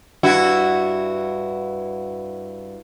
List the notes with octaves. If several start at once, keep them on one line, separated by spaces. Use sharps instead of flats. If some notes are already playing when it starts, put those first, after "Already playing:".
G2 E4 F#4